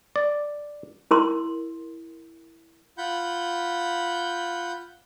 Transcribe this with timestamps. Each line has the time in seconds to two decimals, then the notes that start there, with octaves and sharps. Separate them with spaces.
0.16 D5
1.11 E4 A#4 C6
2.98 F4 F#5 B5 G6